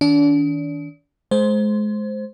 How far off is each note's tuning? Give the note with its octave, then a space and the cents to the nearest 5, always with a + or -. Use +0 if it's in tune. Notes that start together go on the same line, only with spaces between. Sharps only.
D#3 +25 D4 -35
G#3 +30 C5 +0